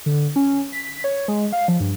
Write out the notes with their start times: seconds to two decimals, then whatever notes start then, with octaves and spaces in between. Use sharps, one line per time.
0.06 D3
0.36 C#4
0.73 B6
1.04 C#5
1.28 G#3
1.53 F5
1.68 F3
1.80 G2